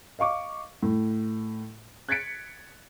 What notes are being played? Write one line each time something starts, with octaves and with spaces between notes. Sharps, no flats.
D#5 F5 C#6 D6
A2
F#6 G#6 A6 B6 C#7 D7